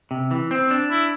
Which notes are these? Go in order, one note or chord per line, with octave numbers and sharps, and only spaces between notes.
C3
E3
C4
D4
E4